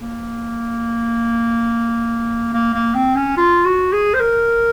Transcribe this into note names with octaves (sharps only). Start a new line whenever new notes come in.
A#3
A#3
A#3
C4
C#4
F4
F#4
G#4
C5
A#4